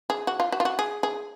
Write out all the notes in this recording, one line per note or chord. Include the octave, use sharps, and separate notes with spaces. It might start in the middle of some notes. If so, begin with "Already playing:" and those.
G#4
F#4
F4
F#4
F4
F#4
G#4
G#4